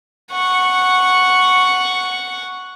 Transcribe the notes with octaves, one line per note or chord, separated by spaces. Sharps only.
F#5 C#6